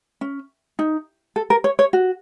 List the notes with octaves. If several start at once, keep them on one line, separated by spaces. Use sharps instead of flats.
C#4
D#4
A4
A#4
C#5
C#5
F#4